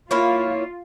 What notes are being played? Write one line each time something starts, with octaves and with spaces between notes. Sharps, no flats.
A#3 E4 F4 C#5